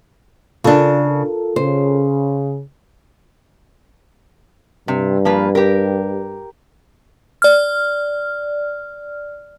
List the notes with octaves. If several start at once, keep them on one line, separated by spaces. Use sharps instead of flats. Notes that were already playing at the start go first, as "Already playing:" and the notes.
C#3 D4 F4 A4 A#4
C#3 C5
G2 C3
F3 A#3 B4
G4 A#4
D5 F6